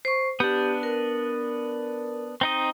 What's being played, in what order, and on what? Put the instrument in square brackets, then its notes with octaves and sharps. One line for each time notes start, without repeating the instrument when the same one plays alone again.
[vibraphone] C5 C#6
[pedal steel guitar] B3 D4 [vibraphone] G4
[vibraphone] A#4
[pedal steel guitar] C4 D#4 D#5